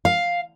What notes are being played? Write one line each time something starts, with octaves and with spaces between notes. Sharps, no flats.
F5